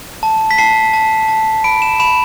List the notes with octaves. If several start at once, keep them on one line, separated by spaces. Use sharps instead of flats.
A5
B6
A5 C7
A5
A5
B5 D7
E7
B5 E7